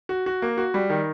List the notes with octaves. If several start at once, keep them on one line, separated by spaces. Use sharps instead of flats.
F#4
F#4
A#3
F#4
G3
D#3